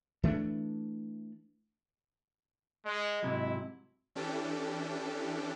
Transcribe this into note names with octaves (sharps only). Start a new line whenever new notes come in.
E3 A3 C4 D4
G#3 D#5
G#2 C3 F#3 E4
E3 C#4 D4 G4 A4